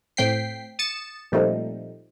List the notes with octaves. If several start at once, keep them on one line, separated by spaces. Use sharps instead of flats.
A2 C4 G5 B6 C7
D#6 A6 C#7 E7
A#2 F3 G3 A3 C4 D#4